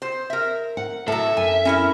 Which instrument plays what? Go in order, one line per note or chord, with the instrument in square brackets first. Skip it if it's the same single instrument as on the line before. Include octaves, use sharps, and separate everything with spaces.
[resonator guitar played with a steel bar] C5
A#4 E5
[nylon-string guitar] F#5
[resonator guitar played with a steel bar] A2 F#3 [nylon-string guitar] A4 [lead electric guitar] E5
[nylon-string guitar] F#2 [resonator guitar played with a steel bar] G#5
[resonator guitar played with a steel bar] C#4 E4 A#4